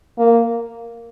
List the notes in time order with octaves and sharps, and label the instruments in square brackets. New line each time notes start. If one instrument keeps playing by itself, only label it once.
[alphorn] A#3